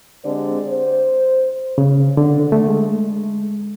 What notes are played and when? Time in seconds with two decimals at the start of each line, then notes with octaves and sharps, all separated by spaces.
0.24 D3 G#3 C4 G4 C5 D5
0.68 C5
1.78 C#3
2.17 D3
2.52 A3
2.69 G#3